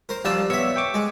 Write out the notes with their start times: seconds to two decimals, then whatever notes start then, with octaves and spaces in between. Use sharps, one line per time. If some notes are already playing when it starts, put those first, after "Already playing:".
0.09 A#4 C5
0.25 F3 G3 D4 D5 F5 E6
0.50 B3 C#5 E5 C#6 E6
0.76 G5 C#6 D6
0.94 G#3